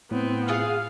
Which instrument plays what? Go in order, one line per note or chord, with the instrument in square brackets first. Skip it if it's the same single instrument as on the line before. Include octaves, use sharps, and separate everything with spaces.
[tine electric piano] A2 [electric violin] B3 C4
[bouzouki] F4 G#4 F#5 [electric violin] F5